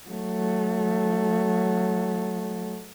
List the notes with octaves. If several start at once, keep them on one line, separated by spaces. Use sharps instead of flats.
F#3 A3